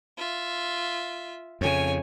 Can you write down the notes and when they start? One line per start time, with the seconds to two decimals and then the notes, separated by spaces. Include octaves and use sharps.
0.18 F4 E5
1.61 F2 C#3 C#5 G#5